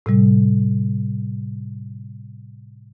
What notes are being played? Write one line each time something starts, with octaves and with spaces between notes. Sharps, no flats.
A2 C3 G3